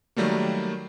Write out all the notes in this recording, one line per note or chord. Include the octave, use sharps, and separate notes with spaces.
D#3 F#3 G3 A3 A#3